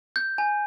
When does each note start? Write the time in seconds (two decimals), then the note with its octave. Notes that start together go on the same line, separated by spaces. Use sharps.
0.16 G6
0.38 G#5